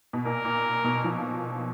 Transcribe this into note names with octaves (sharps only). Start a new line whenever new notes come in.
B2
A#2 A#4
A#2
B2
F3